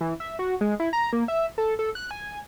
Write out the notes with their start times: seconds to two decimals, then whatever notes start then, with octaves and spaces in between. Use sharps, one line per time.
0.01 E3
0.20 E5
0.39 F#4
0.61 G#3
0.80 E4
0.93 A#5
1.13 A#3
1.28 E5
1.58 A4
1.79 A4
1.95 F#6
2.11 G#5